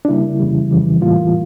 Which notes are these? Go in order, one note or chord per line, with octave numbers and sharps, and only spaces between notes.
D4
C#3 G3 A#3 E4
F2 C#3 E3 G3
F2 C#3 E3 G3
A2 E3 G3 A#3 F4